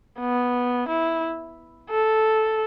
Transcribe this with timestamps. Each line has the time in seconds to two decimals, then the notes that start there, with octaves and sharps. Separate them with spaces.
0.20 B3
0.88 E4
1.90 A4